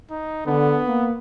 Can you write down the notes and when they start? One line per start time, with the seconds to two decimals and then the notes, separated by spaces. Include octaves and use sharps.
0.10 D#4
0.46 D3 B3
0.86 A#3